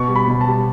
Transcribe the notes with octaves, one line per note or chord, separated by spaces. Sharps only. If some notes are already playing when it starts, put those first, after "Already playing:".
Already playing: B2 C#6
G3
B5
B2
A5
G3